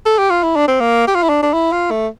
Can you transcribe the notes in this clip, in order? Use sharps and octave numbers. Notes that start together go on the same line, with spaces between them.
A4
G4
F4
E4
D4
C4
A#3
G4
F4
E4
D4
D4
E4
F4
A3